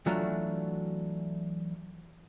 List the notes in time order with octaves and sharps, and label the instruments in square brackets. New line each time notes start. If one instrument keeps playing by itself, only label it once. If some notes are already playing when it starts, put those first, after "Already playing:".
[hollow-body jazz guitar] E3 F#3 A3 D4 F4 F#4